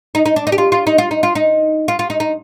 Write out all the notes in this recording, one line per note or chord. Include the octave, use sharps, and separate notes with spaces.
D#4
D#4
D4
D#4
G4
F4
F4
D#4
F4
D#4
F4
D#4
F4
F4
D#4
D#4